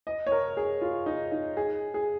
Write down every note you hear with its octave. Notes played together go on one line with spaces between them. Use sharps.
D#5
C#5
A#4
G#4
F4
D#4
D#4
G#4
G#4